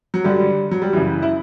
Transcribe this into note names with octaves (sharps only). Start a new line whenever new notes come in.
F#3
G2 D3 G3
F#3
G3
F#2 C#3 E3
E4